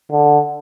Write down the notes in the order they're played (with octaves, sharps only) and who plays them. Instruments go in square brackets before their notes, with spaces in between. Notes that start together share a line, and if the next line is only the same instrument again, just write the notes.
[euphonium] D3